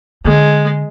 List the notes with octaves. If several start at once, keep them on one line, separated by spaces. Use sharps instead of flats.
D3 G#3